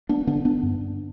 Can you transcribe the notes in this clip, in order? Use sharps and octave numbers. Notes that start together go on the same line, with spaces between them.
B3 D4
D3 B3 D4
B3 D4
G2